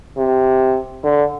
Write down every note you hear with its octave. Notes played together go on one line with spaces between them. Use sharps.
C3
D3